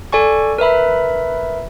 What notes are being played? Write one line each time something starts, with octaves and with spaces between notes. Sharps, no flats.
A4 D5 G#5 C#6
A#4 B4 E5 B5